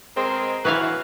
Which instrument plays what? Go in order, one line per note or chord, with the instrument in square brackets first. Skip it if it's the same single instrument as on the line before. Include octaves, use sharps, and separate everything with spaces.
[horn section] B2 G#3 A#4 [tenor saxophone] C4
[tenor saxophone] E3 [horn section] F#4 [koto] B4 C#5 F5